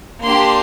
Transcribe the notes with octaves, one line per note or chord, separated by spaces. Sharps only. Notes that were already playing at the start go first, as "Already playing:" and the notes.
A#3 D4 G4 C6